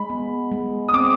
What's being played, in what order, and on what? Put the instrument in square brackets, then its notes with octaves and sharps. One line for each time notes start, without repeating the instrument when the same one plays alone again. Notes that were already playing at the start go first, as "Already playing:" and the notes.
Already playing: [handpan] G#3 [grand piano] B5
[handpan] B3
G#3
[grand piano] D#6
[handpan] C4 [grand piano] D6